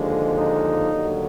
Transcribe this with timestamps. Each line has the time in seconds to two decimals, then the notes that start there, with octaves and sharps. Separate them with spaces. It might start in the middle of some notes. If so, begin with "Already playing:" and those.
Already playing: D#2 D3 F3 G#3
0.38 D#4
0.93 D#2 D3 F#3